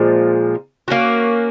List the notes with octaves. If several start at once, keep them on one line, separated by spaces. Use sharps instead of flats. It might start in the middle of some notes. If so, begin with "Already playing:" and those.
Already playing: A#2 F3 G#3
A#3 C#4 F#4